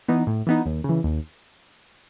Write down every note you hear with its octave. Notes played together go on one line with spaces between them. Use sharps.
E3 B3 D#4
A2
E3 B3 D#4
D#2
C#3 E3
D#2